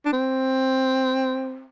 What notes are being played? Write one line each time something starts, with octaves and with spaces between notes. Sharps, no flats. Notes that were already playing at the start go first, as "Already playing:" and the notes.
D4
C4